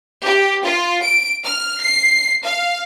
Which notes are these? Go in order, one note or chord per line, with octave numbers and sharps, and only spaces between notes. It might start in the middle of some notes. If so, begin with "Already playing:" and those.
G4
F4
D7
F6
C7
F5